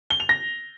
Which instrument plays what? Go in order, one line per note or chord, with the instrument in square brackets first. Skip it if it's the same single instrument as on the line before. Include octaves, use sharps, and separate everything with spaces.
[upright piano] G7
F7
A#6